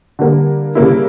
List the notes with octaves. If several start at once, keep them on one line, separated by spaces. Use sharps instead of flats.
D3 G3 A#3
C#3 G3 A#3 E4